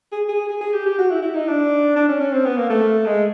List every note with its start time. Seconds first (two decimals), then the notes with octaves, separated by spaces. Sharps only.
0.12 G#4
0.29 G#4
0.49 G#4
0.61 G#4
0.74 G4
0.86 G4
0.99 F#4
1.11 E4
1.22 E4
1.35 D#4
1.48 D4
1.96 D4
2.08 C#4
2.21 C#4
2.33 C4
2.45 B3
2.58 A#3
2.70 A3
3.06 G#3